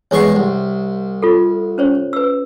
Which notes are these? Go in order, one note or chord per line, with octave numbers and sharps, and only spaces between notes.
E2 G#3 C#5 F#5 C#6
C2
F4 A4
C#4 C5 C#5
B4 E6